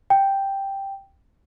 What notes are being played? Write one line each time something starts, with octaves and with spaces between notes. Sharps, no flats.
G5